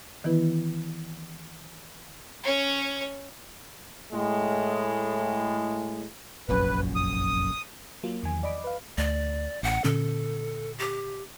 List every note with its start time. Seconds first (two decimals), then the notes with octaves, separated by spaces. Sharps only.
0.24 D#3 E3 B3 E4 B4
2.44 C#4 C#5
4.13 A2 G#3
6.49 F1 A#1 F#2 B4
6.95 D#6
8.03 F#3 A#3 F4
8.23 E2 D#3 F3 F#3 G#5
8.43 D5 D#5 B5 D6
8.64 B4 F5
8.98 D2 D5
9.63 A1 F#5
9.84 A#2 D3 C#4 A4
10.78 G4